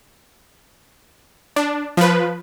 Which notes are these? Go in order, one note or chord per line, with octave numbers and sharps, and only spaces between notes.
D4
F3 B4